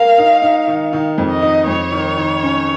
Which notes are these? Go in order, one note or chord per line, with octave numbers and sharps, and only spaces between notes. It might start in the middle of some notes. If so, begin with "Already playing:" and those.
Already playing: A#4 F5
D#4
D#4
D#3
D#3
F2
D#5
D#4
F2 C#5
D#3
D#3
C#4